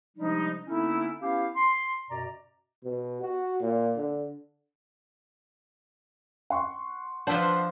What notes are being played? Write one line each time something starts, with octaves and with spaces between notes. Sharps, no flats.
C3 F3 G3 G#3 D4 D#4
D3 A#3 B3 C#4 D#4 E4
B3 C#4 E4 G4 F5
C6
F#2 B2 D5 A#5
B2
F#4
A#2
D3
F#5 C6 C#6
F3 D4 F4 C5 E5 F#5